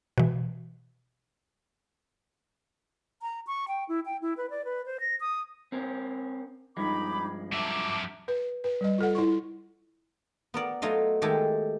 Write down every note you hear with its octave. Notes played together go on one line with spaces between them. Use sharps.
B2 E3
A#5
C#6
G5
E4
G5
E4
B4
D5
B4
C5
A#6
D#6
C4 C#4 A#4
G2 F3 G#3 D#4 B5 D6
F#3 E5 A5 D6
B4
B4
G3 D#5
F4 A4 F#5
E4 C#6
B3 A#4 D5
F#3 A3 F4 D#5 F5
D#3 G#3 A3 G4 A4